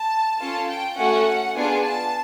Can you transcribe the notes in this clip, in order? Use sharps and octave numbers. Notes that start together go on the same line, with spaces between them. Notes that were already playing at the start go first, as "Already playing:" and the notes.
Already playing: A5
C#4 F4 A4 A5
G5
A3 C#4 F#4 A4 F#5
B3 D4 F4 G#4 G#5
A5